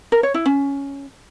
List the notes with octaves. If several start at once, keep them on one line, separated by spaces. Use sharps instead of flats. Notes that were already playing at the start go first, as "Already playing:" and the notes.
A#4
C#5
E4
C#4